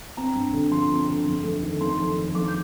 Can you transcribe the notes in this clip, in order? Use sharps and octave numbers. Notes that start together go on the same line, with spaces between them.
C4 A#5
G2
D3
F3 C6
C4
D3
F2
A3
D#3
F2 C6
D#3
D#3
F2 D6
G6